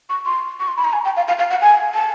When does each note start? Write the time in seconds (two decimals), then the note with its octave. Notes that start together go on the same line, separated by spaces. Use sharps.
0.10 C#6
0.26 C6
0.60 C#6
0.68 C6
0.77 B5
0.85 A#5
0.93 G#5
1.05 G5
1.17 F5
1.28 F5
1.39 F5
1.50 F#5
1.62 G#5
1.94 A5